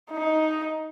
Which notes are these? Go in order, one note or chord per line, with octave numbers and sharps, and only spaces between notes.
D#4